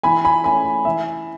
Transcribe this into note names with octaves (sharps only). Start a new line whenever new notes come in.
E3 G#5 B5
G#5 B5
A3 C#4 G#5 B5
E3 E5